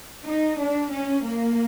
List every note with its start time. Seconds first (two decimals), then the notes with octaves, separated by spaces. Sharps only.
0.24 D#4
0.58 D4
0.91 C#4
1.24 A#3